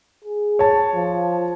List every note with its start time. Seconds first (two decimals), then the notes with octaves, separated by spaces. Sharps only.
0.24 G#4
0.59 C#5 A5
0.95 F3